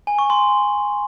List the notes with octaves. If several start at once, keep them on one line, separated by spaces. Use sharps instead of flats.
G#5
C#6
C6